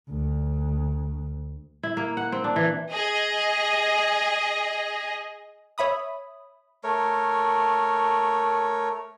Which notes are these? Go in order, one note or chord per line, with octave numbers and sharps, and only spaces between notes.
D2
E4
A#3
F#5
C4
D4
E3
G#4 D#5
C#5 E5 B5 D#6
A3 A#4 C#5